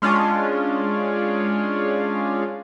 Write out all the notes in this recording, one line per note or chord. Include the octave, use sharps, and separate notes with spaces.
G#3 C#4 D4 F4